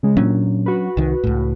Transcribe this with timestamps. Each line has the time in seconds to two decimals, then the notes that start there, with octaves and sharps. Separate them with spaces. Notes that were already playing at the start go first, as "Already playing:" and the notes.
0.03 C#3 G#3
0.17 A#2 F#3 C#4 D4
0.66 F#4 B4
0.97 C2 D#3
1.24 C#2 A2